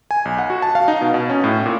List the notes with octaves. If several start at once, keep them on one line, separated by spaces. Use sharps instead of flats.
G#5
B1
F#5
F#4
A5
F5
D#4
B2
B2
C#4
A2
A#2